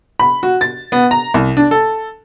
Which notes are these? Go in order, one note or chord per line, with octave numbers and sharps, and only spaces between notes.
B5
F#4
A6
B3
A#5
C2
D4
A4